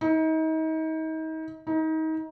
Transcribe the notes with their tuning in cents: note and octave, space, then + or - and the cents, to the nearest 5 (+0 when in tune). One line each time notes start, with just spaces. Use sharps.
D#4 +35
D#4 +30